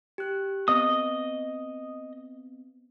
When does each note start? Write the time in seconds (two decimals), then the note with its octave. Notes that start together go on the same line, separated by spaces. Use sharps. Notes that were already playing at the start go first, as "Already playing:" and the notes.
0.18 G4 F#6
0.68 B3 C4 D#5 D#6